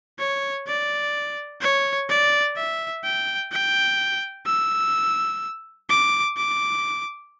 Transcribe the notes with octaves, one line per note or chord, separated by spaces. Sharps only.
C#5
D5
C#5
D5
E5
G5
G5
E6
D6
D6